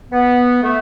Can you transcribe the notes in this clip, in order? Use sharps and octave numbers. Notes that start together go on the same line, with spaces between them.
B3
A3